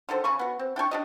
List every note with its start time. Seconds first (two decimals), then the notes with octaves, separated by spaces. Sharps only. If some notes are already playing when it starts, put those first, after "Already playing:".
0.09 D3 D#3 A4 C5
0.24 C#3 G#5 B5 C#6
0.39 B3 F#4
0.59 C4
0.76 D4 G5 G#5 C#6
0.91 D4 G4 D#5